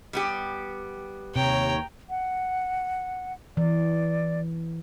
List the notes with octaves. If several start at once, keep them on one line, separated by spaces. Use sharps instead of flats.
G3 B3 G4
D#2 C3 C#5 G5 A#5
F#5
E3 D5